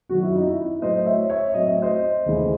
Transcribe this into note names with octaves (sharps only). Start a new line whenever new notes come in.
F#2 D#3 F#3 F#4
E4
D#4
E4
A2 F#3 A3 C5 D#5
D#5
C#5 E5
C#5 E5
A2 F#3 C4 D#5
E5
C5 D#5
D#2 C#3 E3 A3